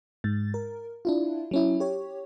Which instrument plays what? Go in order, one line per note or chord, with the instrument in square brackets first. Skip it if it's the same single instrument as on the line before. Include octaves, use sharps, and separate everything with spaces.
[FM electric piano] G#2 A6
A#4
D4 E4 F4
F#3 C#4 E4
G4 C#5